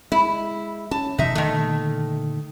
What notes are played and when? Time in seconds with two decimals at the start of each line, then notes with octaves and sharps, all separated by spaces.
0.12 G#3 E4
0.91 C#4 A5
1.18 B2 E3 D#4 E5
1.35 A#2 D3 D#3 A3